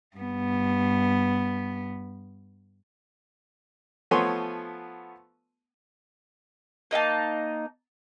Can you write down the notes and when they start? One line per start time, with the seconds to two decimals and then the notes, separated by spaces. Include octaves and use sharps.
0.17 G2 B3
4.11 F3 A3 B3 C#5 G#5 C6
6.91 A#3 D#4 D#5 A5